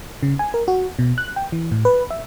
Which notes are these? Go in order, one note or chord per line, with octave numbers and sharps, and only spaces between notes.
C#3
G#5
A#4
F#4
B2
F#6
G5
E3
A2
B4
E5